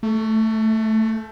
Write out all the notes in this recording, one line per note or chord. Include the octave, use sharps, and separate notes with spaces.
A3